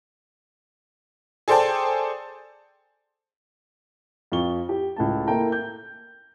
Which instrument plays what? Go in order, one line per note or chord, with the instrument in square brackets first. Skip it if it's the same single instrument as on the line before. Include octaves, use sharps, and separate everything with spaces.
[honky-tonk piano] G#4 A4 C5 D5 G5 A5
[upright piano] F2 F4 C#6 G7
G4
C#2 A2 A5
A#3 E4 A4 G5 A#5
G6